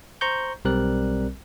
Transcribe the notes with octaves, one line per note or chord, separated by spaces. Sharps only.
C5 A#5 C#6 G6
B1 G3 C4 A#4 D5 F#6